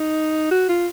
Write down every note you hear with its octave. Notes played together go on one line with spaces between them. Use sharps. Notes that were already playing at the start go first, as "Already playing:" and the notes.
Already playing: D#4
F#4
F4